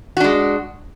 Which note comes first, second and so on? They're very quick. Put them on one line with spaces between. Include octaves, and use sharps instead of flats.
F#4 D4 G#3